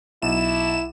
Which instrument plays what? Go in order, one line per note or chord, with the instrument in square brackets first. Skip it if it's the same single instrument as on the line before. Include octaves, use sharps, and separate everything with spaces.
[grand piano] B1 [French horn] E4 [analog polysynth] E7